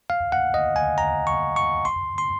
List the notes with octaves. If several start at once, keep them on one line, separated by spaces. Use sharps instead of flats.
F5
F#5
D#5
G#5
A#5
C#6
C#6
C6
C6